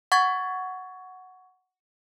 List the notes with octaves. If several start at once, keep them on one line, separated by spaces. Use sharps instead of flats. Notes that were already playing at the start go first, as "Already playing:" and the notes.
F#5 C#6 G#6 A6